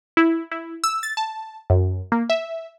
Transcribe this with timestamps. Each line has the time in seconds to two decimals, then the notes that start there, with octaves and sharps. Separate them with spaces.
0.17 E4
0.51 E4
0.84 E6
1.03 A6
1.17 A5
1.70 F#2
2.12 A#3
2.30 E5